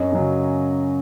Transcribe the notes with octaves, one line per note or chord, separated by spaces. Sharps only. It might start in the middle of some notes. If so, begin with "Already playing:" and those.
Already playing: F#2 C#5 D#5
C#3 F#3